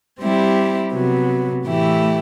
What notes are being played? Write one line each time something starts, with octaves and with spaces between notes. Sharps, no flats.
G3 C4 E4 G4
C3 F#3 B3
A2 E3 A3 E4 G4